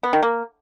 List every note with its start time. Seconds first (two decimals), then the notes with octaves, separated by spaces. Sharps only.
0.03 B3
0.13 D#3
0.23 A#3